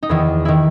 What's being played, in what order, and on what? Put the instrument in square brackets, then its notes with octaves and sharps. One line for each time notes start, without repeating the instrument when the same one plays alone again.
[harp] D#4
E2 D#3 E4
D#3 E4